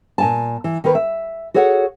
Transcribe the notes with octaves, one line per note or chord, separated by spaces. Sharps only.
A#2 G#5 A5
E3
D#3 A#3 A#4 B4
E5
F#4 G#4 A4 C#5 F#5